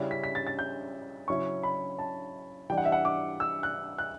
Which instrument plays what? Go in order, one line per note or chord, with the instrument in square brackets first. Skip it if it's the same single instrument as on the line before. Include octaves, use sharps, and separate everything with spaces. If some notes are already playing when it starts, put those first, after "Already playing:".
Already playing: [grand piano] C#3 G3 C#4 E4
B6
B6
A6
A6
G6
C#3 F#3 C#4 E4 C#6
B5
A5
E3 G3 D4 G5
F#5
E5
F#5
D6
E6
F#6
F#6